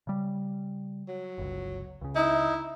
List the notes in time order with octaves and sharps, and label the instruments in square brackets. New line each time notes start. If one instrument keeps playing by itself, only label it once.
[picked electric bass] C#3 G3
[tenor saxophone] F#3
[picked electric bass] G1 C#2
C#2 C#3
[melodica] D#4 [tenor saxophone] E4